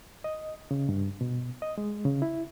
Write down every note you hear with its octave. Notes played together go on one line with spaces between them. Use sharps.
D#5
C#3
G2
B2
D#5
G#3
C#3
E4